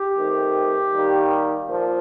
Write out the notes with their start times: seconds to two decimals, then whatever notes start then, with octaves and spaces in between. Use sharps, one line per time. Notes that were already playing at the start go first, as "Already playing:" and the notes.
Already playing: G4
0.16 D#3 A3 C4
0.93 D#3 G3 A#3
1.69 A#2 F3